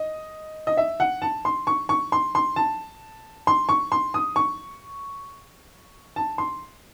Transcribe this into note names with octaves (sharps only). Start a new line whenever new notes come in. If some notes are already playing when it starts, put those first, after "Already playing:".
Already playing: D#5
D#5
E5
F#5
A5
C6
C#6
C#6
C6
C6
A5
C6
C#6
C6
D#6
C#6
A5
C6